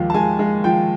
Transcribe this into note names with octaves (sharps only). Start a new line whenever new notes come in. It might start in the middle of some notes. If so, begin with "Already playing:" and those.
Already playing: D#2 F3 G#3
A5
G#3 G#5
G#3
F3 G5